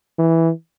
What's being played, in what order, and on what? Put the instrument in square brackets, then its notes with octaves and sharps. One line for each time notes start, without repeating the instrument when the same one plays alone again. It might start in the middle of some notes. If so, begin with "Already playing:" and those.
[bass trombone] E3